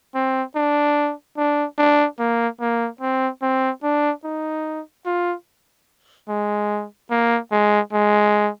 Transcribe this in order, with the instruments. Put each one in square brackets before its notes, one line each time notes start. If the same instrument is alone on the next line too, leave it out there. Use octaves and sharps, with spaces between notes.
[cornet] C4
D4
D4
D4
A#3
A#3
C4
C4
D4
D#4
F4
G#3
A#3
G#3
G#3